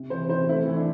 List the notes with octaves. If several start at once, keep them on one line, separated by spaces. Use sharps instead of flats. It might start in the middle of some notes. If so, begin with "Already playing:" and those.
Already playing: C3
E3 C5
E3 C5
A3 E4
E3
D4